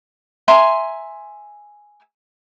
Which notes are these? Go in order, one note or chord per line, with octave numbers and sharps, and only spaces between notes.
E5 G#5 A#5 C6